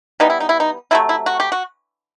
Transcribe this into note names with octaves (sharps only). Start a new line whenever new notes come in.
E3 G3 B3 D#4
E4
D#4
E4
D#4
C3 F#3 A3 E4
E4
F#4
G4
F#4